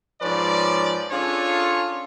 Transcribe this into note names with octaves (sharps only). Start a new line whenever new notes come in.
G#2 F3 C#4 B4 D5
C#4 D4 F4 G#4 A4 C#5